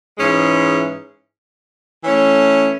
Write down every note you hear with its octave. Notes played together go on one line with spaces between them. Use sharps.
G#2 E3 G#3 C#4
E3 A3 C#4